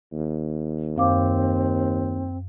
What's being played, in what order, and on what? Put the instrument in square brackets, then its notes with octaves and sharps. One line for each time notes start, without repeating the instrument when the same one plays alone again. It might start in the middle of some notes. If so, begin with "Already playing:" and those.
[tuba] D#2
[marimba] F#2 F5 D6 [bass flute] C4